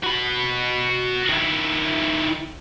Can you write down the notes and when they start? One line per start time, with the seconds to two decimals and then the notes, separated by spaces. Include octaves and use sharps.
0.04 F#4 B5
1.30 D#3 E4